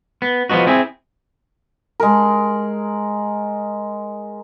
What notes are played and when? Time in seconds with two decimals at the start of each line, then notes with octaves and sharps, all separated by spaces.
0.22 B3
0.50 F3 F#3 B3 D#4 F#4
0.67 C4 E4 G#4
2.00 G#3 A#4